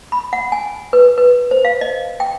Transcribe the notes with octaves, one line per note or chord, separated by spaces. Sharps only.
B5
F#5
G#5
B4
B4
C5
F5
D#5
G5